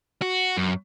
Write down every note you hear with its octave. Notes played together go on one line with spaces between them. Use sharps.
F#4
F#2